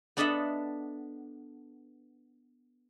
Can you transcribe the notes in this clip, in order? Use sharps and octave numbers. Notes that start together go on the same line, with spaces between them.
B3 D4 A4 D#5 E5 F#5